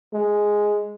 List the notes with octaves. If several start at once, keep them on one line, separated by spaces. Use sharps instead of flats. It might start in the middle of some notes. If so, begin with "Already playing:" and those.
G#3